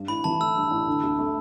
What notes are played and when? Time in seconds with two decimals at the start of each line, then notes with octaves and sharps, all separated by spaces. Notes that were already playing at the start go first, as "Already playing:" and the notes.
Already playing: G2
0.08 A1 B5
0.24 E3 A5
0.40 A3 E6
0.55 G2
0.71 A1
0.88 D3
1.03 D2
1.18 A3